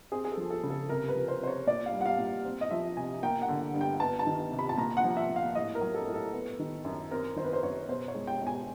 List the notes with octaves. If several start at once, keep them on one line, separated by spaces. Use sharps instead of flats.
C4 G#4
G#4
A4
F3
A4
C#3
A4
C3 A#4
B4
F3
C5
C3 C5
C#5
A#2 D5
F5
G3
F#5
F5
A#2
C4
D#5
F3 E5
C3 G#5
A#3 G5
F#5
D3
G2
G5
B3 A5
A5
D#3
C3
B5
A5
A#2 A#5
F#5
F3
E5
A#2
F5
A2 D#5
A#4
F#3
A4
A2
A4
B3
D#3
F#2
C4 A#4
D#3 C5
B4
C5
F#2 C#5
B2 C5
C#5
G#3
G5
B2
G#5